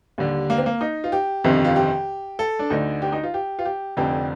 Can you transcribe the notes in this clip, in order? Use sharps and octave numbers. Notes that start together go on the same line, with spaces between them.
D#2 D3 G3
A#3
C4
A#3
D#4
F4
G4
G1 F2 C3 D#3
F4
G4
A4
D4
D2 D3 D#4
G4
D#4
F4
G4
F4
G4
F1 F2 D3 G4